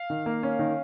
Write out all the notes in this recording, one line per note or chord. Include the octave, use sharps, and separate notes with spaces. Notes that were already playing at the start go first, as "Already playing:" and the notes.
Already playing: F5
D#3
A#3
C#4
D#3